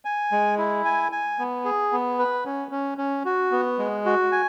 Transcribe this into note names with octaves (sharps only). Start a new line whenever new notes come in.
G#5
G#3
E4
G#5
G#5
B3
G#4
B3
B4
C#4
C#4
C#4
F#4
B3
G#3
F#4
G#5